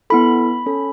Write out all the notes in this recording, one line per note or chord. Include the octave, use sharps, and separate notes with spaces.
B3 E4 A4 B5
C#4 A4